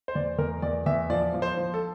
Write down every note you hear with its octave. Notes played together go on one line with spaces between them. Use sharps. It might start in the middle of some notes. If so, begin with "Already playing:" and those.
C5
E2 D5
E2 A#4
E2 D5
E2 E5
F3 D5
F3
C5
F3
A4